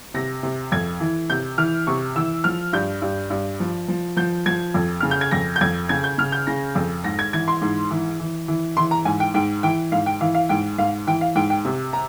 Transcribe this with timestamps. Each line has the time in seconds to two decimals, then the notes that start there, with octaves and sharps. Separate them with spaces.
0.14 C3 A#6
0.43 C3
0.72 F2 G#6
1.00 E3
1.30 C3 G6
1.58 E3 F6
1.87 C3 C#6
2.16 E3 E6
2.44 F3 F6
2.73 G2 G6
3.02 G2
3.30 G2
3.60 F3
3.88 F3
4.16 F3 G6
4.46 F3 G#6
4.74 F2
5.00 C#3 F6
5.11 G6
5.21 G#6
5.31 F2 A#6
5.56 G6
5.61 F2 G#6
5.89 C#3 G#6
6.04 G6
6.18 C#3 F6
6.32 G6
6.47 C#3 A#6
6.75 F2
7.04 G#2 A#6
7.19 G#6
7.33 E3 G#6
7.48 C6
7.62 G#2
7.91 E3
8.20 E3
8.48 E3
8.77 E3 C6
8.91 A#5
9.05 G#2 G#5
9.20 G5
9.34 G#2 G5
9.63 E3 G5
9.92 G#2 F5
10.06 G5
10.21 E3 F5
10.34 F5
10.49 G#2 G5
10.78 G#2 F5
11.07 E3 G5
11.21 F5
11.35 G#2 G5
11.50 G5
11.65 C3
11.93 A#5